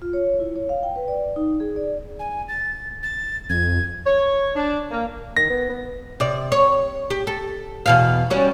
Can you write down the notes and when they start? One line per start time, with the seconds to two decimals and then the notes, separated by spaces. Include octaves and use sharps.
0.02 F4
0.13 C#5
0.40 E4
0.56 C#5
0.69 F5
0.83 G5
0.96 B4
1.08 D5
1.36 D#4
1.60 G#4
1.76 D5
2.19 G#5
2.48 A6
3.03 A6
3.50 F2 G#6
4.07 C#5
4.56 D4
4.91 A#3
5.37 D#3 A#6
5.50 B3
5.69 B3
6.20 C3 D5
6.52 C#5
7.10 G4
7.27 A4
7.86 E2 B2 F5
8.30 G3 C#4 F#4